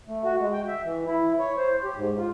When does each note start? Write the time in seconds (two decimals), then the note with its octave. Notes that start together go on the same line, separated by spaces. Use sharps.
0.08 A3
0.24 F#4
0.40 G#3
0.53 G5
0.68 E5
0.85 E3
1.07 E4
1.39 C#5
1.58 C5
1.84 G4
1.96 G#2
2.18 F4